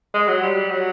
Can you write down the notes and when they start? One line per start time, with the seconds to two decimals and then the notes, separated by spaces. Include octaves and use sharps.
0.14 G#3
0.28 F#3
0.42 G3
0.71 F#3